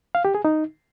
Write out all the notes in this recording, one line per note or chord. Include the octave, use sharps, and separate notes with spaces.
F5
G4
G#4
D#4